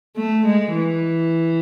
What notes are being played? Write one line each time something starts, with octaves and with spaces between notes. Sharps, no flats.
A3
G#3
E3